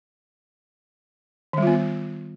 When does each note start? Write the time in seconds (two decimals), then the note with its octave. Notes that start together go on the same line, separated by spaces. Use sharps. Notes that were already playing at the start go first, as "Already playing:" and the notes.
1.53 D#3
1.58 G3
1.62 F4
1.67 B3